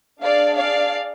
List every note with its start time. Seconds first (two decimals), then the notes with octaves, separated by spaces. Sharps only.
0.22 D4 G#4 D5 F5
0.56 D5 F5